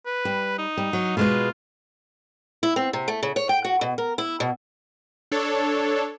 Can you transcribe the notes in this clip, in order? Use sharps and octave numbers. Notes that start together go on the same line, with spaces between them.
B4
G3
D#4
G3
F#3
B2 G#3 F4 B4
E4
C4
C3
A3
C#3
C#5
G5
F#4
B2
A#4
E4
B2
D4 A4 C#5